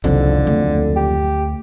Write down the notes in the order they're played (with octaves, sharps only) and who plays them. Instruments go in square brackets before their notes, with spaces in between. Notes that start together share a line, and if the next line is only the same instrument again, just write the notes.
[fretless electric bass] F#1 F2 [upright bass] C2 D#3 [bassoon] D3
[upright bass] D2
[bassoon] G4